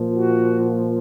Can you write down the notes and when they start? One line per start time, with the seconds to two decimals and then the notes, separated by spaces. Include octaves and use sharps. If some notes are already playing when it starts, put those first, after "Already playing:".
Already playing: A#2 F3
0.16 F#4